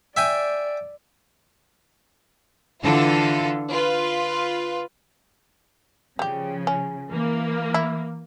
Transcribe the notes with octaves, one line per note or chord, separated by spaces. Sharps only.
D5 E5 G5 G#5
D3 E3 F4 A4
F4 B4
C#3 F3 G3 G4
C#4
E3 A#3
E4